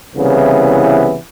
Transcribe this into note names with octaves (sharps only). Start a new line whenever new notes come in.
C2 C#3 E3 B3